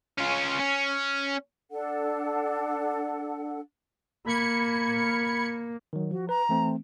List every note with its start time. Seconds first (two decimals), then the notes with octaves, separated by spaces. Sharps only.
0.18 C#4 F4
0.59 C#4
1.71 D4 A4 F#5
4.26 A#3 B5 G#6 C#7
5.93 D#3 F#3
6.11 F3 F#4
6.29 B4 A#5
6.49 E3 A3 C4